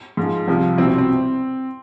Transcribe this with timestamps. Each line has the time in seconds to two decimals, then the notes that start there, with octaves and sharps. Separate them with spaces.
0.17 G#2 F3
0.48 C2 C3 F3
0.78 C2 C4 E4
0.82 B2
0.88 C4
0.98 C4